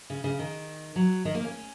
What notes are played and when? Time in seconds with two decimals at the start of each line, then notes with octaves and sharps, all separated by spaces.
0.10 C#3
0.24 C#3
0.39 D#3
0.96 F#3
1.25 D#3
1.35 A#3
1.44 C#4